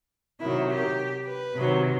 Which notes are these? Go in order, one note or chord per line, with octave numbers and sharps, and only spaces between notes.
C3 D#3 F#3 E4
G4
B4
C3 D#3 F#3